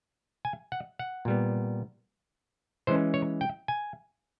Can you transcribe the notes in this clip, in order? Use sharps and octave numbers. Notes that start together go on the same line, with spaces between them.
G#5
F#5
F#5
A#2 G3 B3
E3 G#3 C#4 C5
C#5
G5
G#5